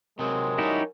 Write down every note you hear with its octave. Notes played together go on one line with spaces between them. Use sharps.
C3 F#3 G#3 C4 A#4
F#3 G3 C#4 D#4 E4 G4